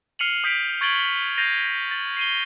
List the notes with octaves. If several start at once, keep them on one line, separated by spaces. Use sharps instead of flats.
F6 C7 C#7 D#7 F7 F#7
D#6 G6 B6 C7 D7
C#6 G#6 A6 D7 F#7 G7
G6 A6 A#6 C7 D#7 F7
A6 F#7
C7 D#7 G7